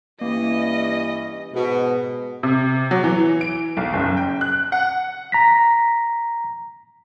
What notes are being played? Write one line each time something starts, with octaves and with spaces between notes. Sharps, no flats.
G2 E3 A#3 C#4 D#5
G#2 B2
C3
F#3
E3
D7
B1
F#1
G5
F#6
F#5
A#5 A#6 B6